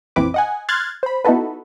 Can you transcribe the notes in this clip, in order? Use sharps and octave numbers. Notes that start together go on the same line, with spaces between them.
A#1 F2 E3 C4 B4 D6
D#5 F#5 G#5
C6 F6 F#6 G#6 A6
C5 B5
B3 D#4 E4 F#4 A4 B4